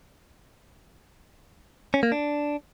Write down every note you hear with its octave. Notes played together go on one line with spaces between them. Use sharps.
C#4
A#3
D4